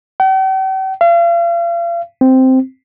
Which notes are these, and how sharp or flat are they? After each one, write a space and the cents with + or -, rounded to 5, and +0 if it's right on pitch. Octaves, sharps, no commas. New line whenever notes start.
G5 -45
F5 -40
C4 -5